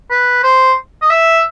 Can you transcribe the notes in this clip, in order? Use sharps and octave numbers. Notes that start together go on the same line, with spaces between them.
B4
C5
D#5
E5